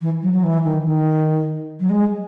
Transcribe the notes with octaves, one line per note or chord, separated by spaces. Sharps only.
E3
F#3
F#3
E3
D#3
D#3
F#3
G#3